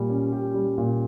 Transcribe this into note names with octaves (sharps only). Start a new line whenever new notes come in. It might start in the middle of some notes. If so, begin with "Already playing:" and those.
Already playing: A#2 G3
C#4
G4
G3
A#2